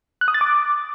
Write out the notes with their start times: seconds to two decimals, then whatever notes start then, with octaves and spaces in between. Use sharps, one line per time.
0.21 F#6
0.28 D#6
0.34 A6
0.41 D6